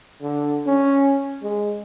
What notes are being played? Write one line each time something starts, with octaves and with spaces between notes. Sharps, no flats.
D3
C#4
G#3